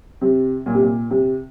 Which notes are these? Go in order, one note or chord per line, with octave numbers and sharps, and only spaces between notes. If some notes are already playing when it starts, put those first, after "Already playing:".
C3
A#2
C3
A#2
C3